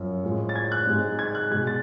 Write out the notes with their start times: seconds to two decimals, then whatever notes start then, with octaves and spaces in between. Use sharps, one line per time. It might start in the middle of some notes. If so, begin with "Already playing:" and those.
Already playing: F#2 F3
0.23 A2 F3 G#3
0.49 A6
0.56 G#6
0.72 F#6
0.87 G#2 G#3
1.19 G#6
1.35 F#6
1.51 G#3 G#6
1.54 B2
1.67 A6